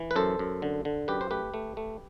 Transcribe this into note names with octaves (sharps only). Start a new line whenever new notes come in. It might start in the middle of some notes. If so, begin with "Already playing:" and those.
Already playing: E3
B4
F#2 A4 C5
F#2
D3
D3
F#2 G4 B4
C5
A3 G4 B4
A3
A3